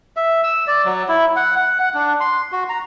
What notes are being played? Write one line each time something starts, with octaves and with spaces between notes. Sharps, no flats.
E5
E6
D5
F#3
E4
F#5
F#5
F#5
D4
C6
F#4
A#5